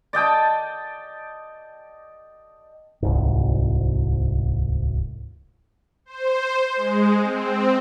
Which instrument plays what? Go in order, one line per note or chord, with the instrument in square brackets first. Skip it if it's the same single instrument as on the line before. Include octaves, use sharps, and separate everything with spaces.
[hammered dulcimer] D5 D#5 G5 A5
[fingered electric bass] D1 C2 G#2
[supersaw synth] C5
G#3
C4